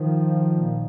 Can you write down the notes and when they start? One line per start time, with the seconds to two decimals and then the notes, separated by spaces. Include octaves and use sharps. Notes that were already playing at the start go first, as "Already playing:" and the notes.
Already playing: D#3 F3
0.52 A#2